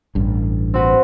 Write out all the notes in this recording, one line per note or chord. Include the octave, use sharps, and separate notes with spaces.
A1 G2
C4 F#4 B4